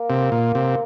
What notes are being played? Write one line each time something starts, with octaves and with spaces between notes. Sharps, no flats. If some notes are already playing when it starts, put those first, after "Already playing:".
Already playing: A#3
C3
A#2
C3